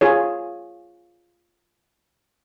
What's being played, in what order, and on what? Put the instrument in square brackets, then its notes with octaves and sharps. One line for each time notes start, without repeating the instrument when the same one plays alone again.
[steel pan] F4 G#4 C#5